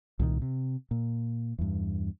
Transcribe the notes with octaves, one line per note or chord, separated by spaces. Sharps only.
C2 A#2 D3 D#3
C3
A#2
E2 G2